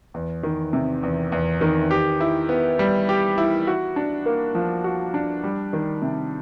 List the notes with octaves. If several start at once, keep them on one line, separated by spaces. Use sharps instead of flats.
E2
D#3
C3
E2
E2
D#3
G4
E4
B3
G3
G4
E4
F#4
D4
A#3
F3
F#4
D4
G3
D#3
C3